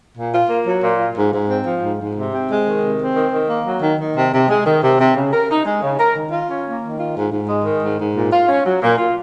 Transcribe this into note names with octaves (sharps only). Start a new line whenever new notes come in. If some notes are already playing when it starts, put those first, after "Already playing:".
A#2
F4
A#3
F#3
A#2
F4
G#2
G#2
C4
F3
G#2
G#2
C3
C4
G#3
D#3
C3
C4
D#3
D#3
A#3
F#3
D#3
D#3
C3
C3
G#3
D#3
C3
C3
C#3
A#4
D#4
G#3
C#3
A#4
D#3
F4
C#4
A#3
D#3
F4
G#2
G#2
G#3
D#3
G#2
G#2
A#2
F4
C#4
F#3
A#2
F4